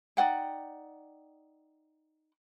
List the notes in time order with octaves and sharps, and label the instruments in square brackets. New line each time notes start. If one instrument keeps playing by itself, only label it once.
[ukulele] D#4 D5 F#5 G5